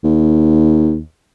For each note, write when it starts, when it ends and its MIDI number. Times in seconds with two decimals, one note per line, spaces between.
0.04 1.00 39